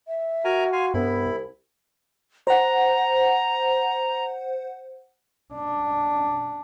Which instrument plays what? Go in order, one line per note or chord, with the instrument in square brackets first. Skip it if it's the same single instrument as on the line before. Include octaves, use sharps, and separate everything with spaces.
[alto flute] E5
[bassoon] F#4 [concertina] A#4 G#5 A#5
[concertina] F5 G#5 [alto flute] C6
[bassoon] C2 [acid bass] G2 [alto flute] B3 [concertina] E4 B5
[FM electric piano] C5 F#5 [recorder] A#5
[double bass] D4